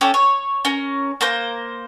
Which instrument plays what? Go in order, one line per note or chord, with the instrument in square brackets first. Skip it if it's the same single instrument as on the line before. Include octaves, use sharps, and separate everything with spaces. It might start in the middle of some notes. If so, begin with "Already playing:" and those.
[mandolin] C#4 G4 A4 D6
C#5
C#4 A#4
A#3 A#4 C5